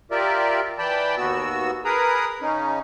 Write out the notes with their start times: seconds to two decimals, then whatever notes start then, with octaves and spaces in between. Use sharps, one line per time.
0.11 F4 G4 A#4 D5 E5
0.79 E3 D5 G5 A5 B5
1.17 D#2 B3 F#4 E6
1.85 G#4 A#4 B4 A#5 B5 D#6
2.42 C#3 C#4 D#4